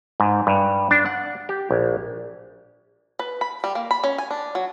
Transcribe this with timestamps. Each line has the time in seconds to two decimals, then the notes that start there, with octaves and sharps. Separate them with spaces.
0.20 G#2
0.47 G2
0.91 D4
1.06 F#5
1.49 G4
1.71 A#1
3.19 B4
3.41 B5
3.64 G3
3.75 A#3
3.91 B5
4.04 C#4
4.18 G#5
4.31 D4
4.55 F#3